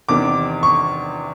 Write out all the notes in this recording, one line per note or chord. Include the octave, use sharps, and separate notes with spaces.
E2 C3 D#3 D6
C#6